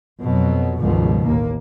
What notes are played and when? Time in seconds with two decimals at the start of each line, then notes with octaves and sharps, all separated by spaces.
0.22 F2 B2 F#3
0.80 C#2 G2 B2 D3 D#3 F3
1.25 A1 D#2 A#3